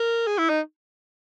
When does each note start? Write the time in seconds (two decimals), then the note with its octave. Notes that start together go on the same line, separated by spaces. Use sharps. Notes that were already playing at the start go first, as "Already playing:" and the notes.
Already playing: A#4
0.27 G#4
0.38 E4
0.49 D#4